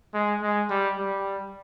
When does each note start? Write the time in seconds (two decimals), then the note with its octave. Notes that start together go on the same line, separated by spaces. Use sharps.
0.14 G#3
0.42 G#3
0.70 G3
0.98 G3